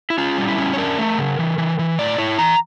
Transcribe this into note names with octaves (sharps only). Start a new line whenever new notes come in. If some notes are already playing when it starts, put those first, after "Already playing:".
E4
C#4 F4
G3
E4
C#4
C#5
D4 A#4
A3
C#3
E3
E3
E3
A2 D5
E4 C#5
E3 A#5